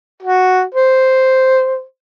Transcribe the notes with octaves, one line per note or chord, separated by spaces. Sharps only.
F#4
C5